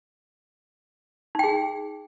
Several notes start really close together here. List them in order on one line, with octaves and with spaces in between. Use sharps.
D#4 G5 G#4